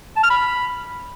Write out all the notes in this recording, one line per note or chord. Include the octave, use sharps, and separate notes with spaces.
A5
F6
B5